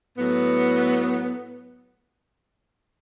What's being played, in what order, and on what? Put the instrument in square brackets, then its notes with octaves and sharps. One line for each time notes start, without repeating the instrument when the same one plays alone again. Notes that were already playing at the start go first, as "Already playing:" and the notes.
[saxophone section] A2 F#3 B3